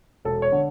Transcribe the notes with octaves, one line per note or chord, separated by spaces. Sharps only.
E1 A4
C#5
D3